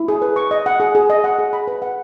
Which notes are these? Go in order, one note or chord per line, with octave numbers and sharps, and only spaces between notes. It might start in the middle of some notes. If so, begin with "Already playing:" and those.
Already playing: E4
G#4
B4
C#6
D#5
F#5
G#4
G#4
D#5
F#5
G#4
B5
B4
F#5